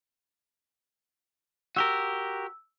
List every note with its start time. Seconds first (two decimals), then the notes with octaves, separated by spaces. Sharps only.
1.76 F#4 G4 A#4 E6